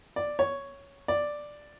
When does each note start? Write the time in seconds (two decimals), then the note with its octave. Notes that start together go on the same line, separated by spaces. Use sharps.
0.16 D5
0.39 C#5
1.08 D5